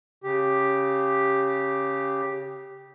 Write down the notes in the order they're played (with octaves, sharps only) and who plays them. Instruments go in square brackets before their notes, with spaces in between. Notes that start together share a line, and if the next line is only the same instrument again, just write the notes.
[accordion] C#3 G4